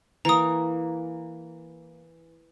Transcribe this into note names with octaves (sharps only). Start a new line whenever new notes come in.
E3 A#3 A#5 D#6